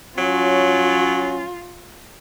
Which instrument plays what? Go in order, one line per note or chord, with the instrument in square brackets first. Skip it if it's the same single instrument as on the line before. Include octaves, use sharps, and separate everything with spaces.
[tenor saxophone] F#3 [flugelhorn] C#4 [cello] F4